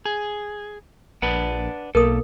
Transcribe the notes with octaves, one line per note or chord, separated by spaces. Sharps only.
G#4
A#1 D4 B4 F#5
B1 A#3 A4 A#4 D#6